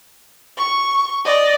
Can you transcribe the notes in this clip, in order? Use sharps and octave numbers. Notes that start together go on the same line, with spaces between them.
C#6
D5 D#5